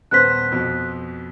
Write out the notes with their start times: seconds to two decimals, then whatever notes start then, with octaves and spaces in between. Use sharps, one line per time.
0.11 D#1 B3 C5 F#6 B6
0.52 F2 B2